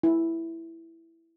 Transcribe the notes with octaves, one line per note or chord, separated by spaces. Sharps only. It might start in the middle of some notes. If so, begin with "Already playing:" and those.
E4